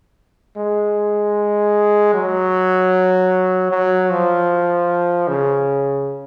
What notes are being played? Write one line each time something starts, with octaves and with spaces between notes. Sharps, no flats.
G#3
F#3
F#3
F3
C#3